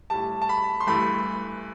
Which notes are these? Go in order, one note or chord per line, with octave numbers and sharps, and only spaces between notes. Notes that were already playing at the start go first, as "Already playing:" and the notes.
A2 G3 A5
A5
B5
C6
G2 E3 A3 B5